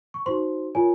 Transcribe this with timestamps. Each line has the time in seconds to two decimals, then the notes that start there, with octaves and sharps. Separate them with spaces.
0.14 C#6
0.26 D#4 F#4 C5 C6
0.75 F4 A#4 C#5 G#5